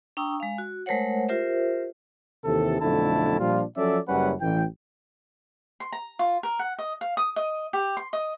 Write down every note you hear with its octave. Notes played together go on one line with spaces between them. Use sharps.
D4 G5 A#5 C#6 D#6 E6
G#3 F5
F#4
G#3 A3 A#4 C5 C#5 F#5
F4 G4 A#4 C5 E5
D#2 C3 E3 A4
B1 F2 D3 A3 E4 A5
A#2 F3 G3 D4 F4
F3 F#3 C#4 A4 D5 E5
F#1 F#2 G3 C#4 B4 F#5
A1 E3 G5
C6
A#5
F4
A#4
F#5
D#5
F5
D#6
D#5
G4
C6
D#5